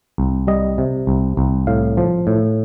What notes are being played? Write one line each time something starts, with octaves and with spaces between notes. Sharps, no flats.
C2
G3 D#5
C3
C2
C2
A2 F5
F3
A2